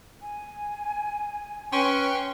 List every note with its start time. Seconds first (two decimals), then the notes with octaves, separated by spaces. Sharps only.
0.21 G#5
1.72 C#4 B4 G5 C6 C#6